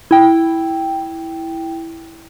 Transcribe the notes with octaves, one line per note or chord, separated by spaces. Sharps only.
E4 G5